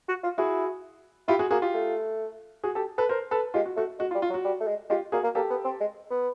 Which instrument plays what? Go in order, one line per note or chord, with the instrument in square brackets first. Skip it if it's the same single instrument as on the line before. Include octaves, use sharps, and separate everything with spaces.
[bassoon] F#4
F4
[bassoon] E4 [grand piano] F#4 G#4
[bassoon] E4 [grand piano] F4 G4
[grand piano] F#4 G#4
[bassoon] A#3 [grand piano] F#4 G#4
[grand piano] F4 G4
[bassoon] A3
[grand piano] F#4 G#4
G4 A4
A4 B4
A#4 C5
A4 B4
[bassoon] G#3 [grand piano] F4 G4
[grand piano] F#4
[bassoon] A3 [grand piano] F#4
[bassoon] G#3 [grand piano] F#4
[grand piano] F4
[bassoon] G3
[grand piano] F4
[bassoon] F#3
[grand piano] F#4
[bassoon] G3
A3
G#3
[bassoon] G#3 [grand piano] F4 G4
[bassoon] A#3 [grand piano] F#4 G#4
[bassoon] A#3
[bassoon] A#3 [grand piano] G4 A4
[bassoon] B3
C4
G#3
B3